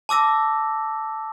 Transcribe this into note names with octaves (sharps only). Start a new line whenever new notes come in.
A5 D6 E6 A#6